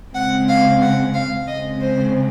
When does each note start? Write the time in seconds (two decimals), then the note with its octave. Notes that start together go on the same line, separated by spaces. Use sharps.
0.14 C#3 G#3 C4 F#5
0.48 F5
0.81 F#5
1.14 F5
1.47 C#3 G#3 C4 D#5
1.81 C5